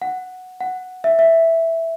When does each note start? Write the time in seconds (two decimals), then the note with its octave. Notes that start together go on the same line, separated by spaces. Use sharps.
0.02 F#5
0.60 F#5
1.04 E5
1.19 E5